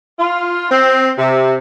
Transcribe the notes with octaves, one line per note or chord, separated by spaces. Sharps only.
F4
C4
C3